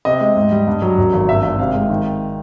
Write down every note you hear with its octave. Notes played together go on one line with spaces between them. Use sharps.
C3 D#5
G#3
G#2
G3
G2
F#3
F#2
G#1
G2 E5
G#1 E5
C3 F5
G#3
D#3